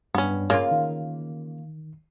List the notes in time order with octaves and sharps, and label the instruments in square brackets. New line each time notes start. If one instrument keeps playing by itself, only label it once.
[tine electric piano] G2 [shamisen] B3 C#4
[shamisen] C#3 [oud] A#3 F4
[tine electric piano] D#3